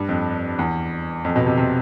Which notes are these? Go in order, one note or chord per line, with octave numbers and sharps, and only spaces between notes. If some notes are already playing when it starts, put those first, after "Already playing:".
Already playing: G2
F2
E2
F2
B2
C3
C3